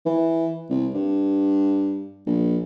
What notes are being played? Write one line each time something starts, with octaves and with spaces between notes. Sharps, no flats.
E3
C2
G2
A#1